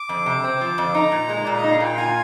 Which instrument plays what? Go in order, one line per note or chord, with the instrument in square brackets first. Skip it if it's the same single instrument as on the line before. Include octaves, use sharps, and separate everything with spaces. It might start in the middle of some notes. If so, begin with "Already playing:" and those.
Already playing: [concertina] D6
[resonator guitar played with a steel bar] F2
C3
C4
F3
F2
[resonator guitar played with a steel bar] D#4 [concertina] A#5
[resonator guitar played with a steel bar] A#2
G#3
[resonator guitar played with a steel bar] A#2 [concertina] D5
[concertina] D#5
[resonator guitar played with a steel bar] D#4
[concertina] F5
[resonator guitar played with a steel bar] A#2 [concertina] G5
[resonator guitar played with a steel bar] F4 [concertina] G#5